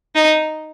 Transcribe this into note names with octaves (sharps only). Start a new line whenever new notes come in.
D#4